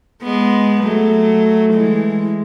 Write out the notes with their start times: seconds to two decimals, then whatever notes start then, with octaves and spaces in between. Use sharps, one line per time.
0.23 G#3 B3
0.84 F#3 A3
1.74 E3 G#3